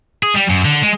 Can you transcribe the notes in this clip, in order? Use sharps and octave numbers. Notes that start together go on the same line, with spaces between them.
G#4
G3
F#2
D3
G#3